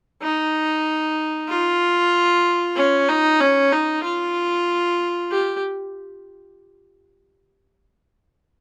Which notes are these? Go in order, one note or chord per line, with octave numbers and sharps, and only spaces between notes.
D#4
F4
C#4
D#4
C#4
D#4
F4
G4